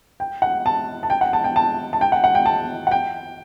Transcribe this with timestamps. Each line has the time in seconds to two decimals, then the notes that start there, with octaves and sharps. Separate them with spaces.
0.20 G5
0.42 F#5
0.66 A5
1.03 A5
1.10 G5
1.21 F#5
1.33 A5
1.44 G5
1.56 A5
1.93 A5
2.01 G5
2.12 F#5
2.24 F#5
2.35 G5
2.46 A5
2.87 F#5
2.91 G5